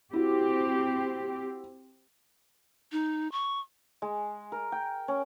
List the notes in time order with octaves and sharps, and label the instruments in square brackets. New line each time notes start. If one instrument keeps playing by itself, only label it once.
[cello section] C4 G4 [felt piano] E4 F#4
[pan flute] D#4
C#6
[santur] G#3
A#4
G5
C#4